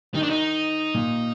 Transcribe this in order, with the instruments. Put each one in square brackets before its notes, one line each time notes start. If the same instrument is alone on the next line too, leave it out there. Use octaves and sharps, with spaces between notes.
[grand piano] D#3 [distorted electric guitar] D#4
[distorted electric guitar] D4
D#4
[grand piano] A#2